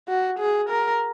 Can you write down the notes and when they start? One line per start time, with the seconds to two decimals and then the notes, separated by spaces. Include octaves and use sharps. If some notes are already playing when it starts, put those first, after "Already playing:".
0.09 F#4
0.39 G#4
0.70 A#4